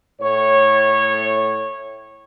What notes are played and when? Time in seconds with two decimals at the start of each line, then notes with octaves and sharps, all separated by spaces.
0.21 A2 C#5